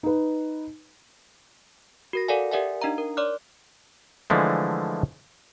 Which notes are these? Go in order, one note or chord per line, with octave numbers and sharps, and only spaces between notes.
D#4 B4
F#4 A#4 A#6
A4 A#4 D5 F5 F#5 G#5
G4 A#4 D5 E5 F#5 G#5
D4 D#4 D#5 F5 A#5
A#4
C#5 D5 C6 D6 F6 F#6
D3 E3 F3 G#3 A3